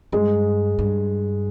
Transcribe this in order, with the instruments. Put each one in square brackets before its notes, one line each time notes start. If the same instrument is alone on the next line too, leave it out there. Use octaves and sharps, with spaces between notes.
[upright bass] G2 [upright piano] G#3
[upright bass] G2